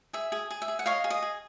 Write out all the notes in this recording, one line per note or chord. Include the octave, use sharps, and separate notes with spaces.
G#4 E5
G#4
G#4
E5
G#4
F#5
C#5 D#5 F5
G#4
D#5
G#4